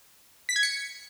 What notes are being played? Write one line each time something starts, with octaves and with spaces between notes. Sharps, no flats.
B6
G#6
C#7